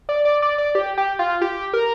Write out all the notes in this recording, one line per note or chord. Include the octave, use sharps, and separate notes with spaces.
D5
D5
D5
D5
G4
G4
F4
G4
A#4